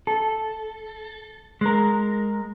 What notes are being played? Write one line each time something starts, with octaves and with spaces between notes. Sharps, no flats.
A4
G#3 A#4